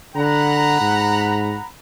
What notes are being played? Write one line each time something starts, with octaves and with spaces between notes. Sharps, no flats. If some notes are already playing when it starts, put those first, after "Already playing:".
D3 F#5 A#5 B5
G#2